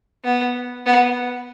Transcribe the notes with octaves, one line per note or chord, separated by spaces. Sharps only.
B3
B3